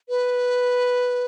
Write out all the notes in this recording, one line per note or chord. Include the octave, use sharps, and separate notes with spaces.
B4